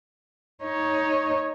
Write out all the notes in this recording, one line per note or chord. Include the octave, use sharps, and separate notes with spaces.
D#4 C#5